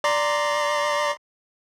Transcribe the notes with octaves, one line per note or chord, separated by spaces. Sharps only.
D5 A#5 C6